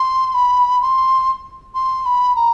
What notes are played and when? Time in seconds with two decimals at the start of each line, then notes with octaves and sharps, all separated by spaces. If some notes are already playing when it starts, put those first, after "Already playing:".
Already playing: C6
0.34 B5
0.82 C6
1.75 C6
2.06 B5
2.36 A#5